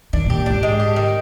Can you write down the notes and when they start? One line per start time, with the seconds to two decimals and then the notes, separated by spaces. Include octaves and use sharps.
0.13 D#3 D4
0.26 A#2 G4
0.46 G#2 D4
0.63 G#3
0.80 G4
0.96 D#3